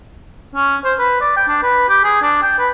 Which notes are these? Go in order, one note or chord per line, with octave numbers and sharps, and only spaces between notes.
C#4
C5
B4
D5
G5
D4
B4
G4
G#4
D4
G5
B4